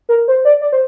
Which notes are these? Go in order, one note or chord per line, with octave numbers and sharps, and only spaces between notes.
A#4
C5
D5
D5
C5